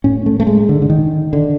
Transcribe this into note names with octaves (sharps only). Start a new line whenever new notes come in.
A2 C#4
A3
A3
G#3
D3
D3
D#3
D3